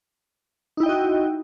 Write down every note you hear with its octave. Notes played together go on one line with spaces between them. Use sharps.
D#4 E4 F#4 D#5 G5